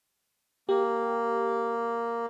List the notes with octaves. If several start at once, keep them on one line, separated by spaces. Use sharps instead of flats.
A#3 G4